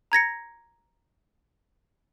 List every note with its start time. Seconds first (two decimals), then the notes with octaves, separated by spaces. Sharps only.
0.12 A#5 G#6 A#6 C#7